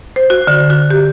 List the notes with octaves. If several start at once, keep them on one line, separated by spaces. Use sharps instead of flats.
C5
F#4
D3
F#4
G4